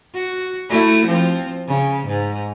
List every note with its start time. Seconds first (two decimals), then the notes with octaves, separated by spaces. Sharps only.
0.14 F#4
0.70 A3 E4 F#4
1.06 F3 C4
1.68 C#3
2.07 G#2